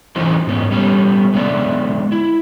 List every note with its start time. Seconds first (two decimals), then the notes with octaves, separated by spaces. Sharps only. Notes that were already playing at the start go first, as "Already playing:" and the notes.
0.16 E3 C#4 D#4 F4 F#4 C5
0.47 G#2 B3 C#4
0.71 G3 B3 C#4
1.34 D3 G#3 B3 D5 E5
2.12 E4